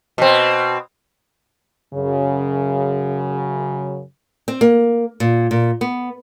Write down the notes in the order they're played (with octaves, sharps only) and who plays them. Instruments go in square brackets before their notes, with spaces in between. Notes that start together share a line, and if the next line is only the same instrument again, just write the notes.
[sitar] B2 C4
[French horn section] F#2 C#3
[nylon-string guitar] C4
A#3
A#2
A#2
B3